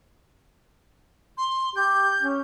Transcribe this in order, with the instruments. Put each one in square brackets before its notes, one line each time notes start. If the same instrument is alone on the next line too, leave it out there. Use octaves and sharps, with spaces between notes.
[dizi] C6
[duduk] G4 [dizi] G6
[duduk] C#4